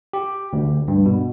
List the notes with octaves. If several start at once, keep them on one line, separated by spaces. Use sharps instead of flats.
G4
D2
G2
B2